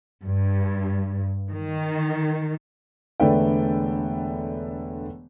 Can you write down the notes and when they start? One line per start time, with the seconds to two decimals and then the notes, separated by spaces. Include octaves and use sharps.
0.22 G2
1.50 D#3
3.20 E1 D3 A3 B4 D5 G5